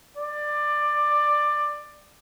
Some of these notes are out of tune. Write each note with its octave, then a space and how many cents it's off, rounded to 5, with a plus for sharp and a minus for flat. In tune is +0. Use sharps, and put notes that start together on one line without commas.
D5 +15